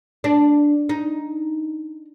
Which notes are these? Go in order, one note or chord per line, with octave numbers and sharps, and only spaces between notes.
D4
D#4